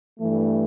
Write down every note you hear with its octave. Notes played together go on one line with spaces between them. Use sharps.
G2 E3 A3